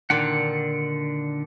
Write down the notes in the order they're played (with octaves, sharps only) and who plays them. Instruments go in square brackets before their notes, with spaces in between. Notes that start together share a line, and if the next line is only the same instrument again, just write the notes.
[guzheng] A#2 D#3 [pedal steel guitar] D3 D4 F#5